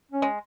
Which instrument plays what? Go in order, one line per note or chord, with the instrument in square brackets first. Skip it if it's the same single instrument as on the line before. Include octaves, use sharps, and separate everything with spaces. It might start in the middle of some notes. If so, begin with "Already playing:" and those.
[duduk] C#4
[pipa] G#3